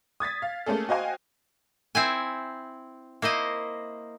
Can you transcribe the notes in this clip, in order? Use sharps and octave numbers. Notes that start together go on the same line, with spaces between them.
D#6 G#6 A6 B6
F5
A3 A#3 C#4 G#4 A4
F#4 C5 D#5 F5 G5 G#5
C4 E4 G#5
A#3 E4 C5 D#5